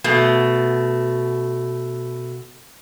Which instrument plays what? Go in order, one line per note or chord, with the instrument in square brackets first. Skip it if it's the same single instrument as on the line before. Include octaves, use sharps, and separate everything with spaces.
[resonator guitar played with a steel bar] B2 A3